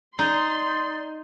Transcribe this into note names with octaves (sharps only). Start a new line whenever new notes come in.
D#4 D5 C6